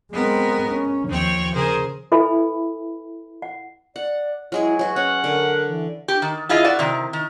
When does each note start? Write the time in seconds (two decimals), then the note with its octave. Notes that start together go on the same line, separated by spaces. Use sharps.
0.12 G#3 B3 C4 A#4
0.68 C#4
1.09 D#2 F3 C4 C#5 G5
1.54 C#3 G#4 A#4 C5
2.12 E4 A4 B4 E5 G#5 B5
3.42 F#5
3.96 D5 F#5
4.52 F#3 G#3 E4 G#4
4.79 F#3 F#4 B4
4.96 C#4 F#5
5.24 D3 A#4
5.69 E3
6.08 G4
6.22 D#3
6.49 E4 F4 G#4 D#5 F5
6.64 F#4 D5
6.79 C3 D#3
7.13 D#3